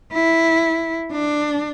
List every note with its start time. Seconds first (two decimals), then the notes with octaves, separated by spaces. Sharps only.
0.13 E4
1.12 D4